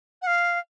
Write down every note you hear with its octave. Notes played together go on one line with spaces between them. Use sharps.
F#5
F5